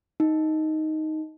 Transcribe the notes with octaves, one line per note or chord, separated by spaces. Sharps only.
D#4